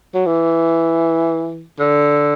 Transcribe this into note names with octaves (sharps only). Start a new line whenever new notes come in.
F#3
E3
D3